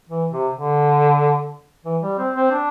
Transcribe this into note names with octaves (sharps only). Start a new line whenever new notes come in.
E3
C3
D3
E3
G3
C4
C4
D4